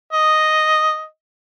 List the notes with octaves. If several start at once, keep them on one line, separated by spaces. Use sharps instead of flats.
D#5